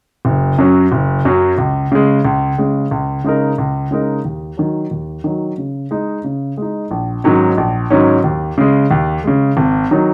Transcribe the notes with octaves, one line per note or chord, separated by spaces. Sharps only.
F#1
F#2 F#3 C#4
F#1
F#2 F#3 C#4
C#2
C#3 G#3
C#2
C#3 G#3
C#2
C#3 G#3 D#4 A#4
C#2
C#3 G#3 D#4 A#4
D#2
D#3 F#3
D#2
D#3 F#3
C#3
G#3 D#4
C#3
G#3 D#4
A#1
G#2 D#3 F#3 C#4
A#1
G#2 D#3 F#3 C#4
D#2
C#3 G#3
D#2
C#3 G#3
G#1
D#3 F#3 D#4